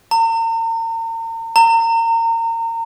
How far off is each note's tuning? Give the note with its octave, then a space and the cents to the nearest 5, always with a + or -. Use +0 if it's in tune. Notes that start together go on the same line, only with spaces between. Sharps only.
A#5 -40
A#5 -30